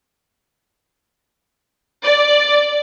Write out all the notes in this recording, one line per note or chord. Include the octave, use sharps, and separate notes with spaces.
D5